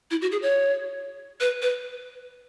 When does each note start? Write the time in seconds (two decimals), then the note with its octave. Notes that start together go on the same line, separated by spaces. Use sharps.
0.11 E4
0.22 F#4
0.32 G#4
0.42 C#5
1.41 B4
1.62 B4